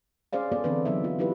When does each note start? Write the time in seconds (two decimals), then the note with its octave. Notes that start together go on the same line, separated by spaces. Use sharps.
0.33 C#4 G#4 C5 D5 F5
0.52 B3 G#4 A4 C5 D5
0.64 D3 E3 C4 D4 A4 B4
0.85 F#3 B3 D#4 E5
1.04 F4
1.19 F#3 D4 E4 G4 B4